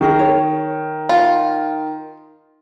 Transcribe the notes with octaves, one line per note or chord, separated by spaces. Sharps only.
D#3 F#4 G#4 A#4
C#5
F4